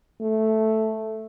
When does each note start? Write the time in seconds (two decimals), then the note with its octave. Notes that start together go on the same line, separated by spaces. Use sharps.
0.21 A3